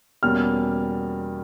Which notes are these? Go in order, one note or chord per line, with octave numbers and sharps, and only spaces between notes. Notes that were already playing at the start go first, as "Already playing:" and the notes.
E2 B2 G3 A#3 C#4 F6